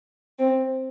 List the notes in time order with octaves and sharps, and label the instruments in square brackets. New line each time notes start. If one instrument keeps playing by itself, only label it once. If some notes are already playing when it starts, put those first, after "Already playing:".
[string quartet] C4